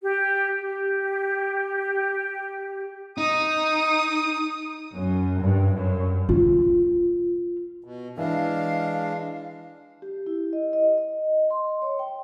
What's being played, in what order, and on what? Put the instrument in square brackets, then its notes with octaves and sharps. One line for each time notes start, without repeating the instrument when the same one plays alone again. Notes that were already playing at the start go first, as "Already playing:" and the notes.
[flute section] G4
G4
[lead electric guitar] D#4 [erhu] D#6
[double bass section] F#2
G2
F#2
[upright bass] F4
[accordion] B2
[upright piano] E3 [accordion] G#3 D4 [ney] F5
[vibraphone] G4
E4
D#5
D#5
D#5
C6
C#5
G5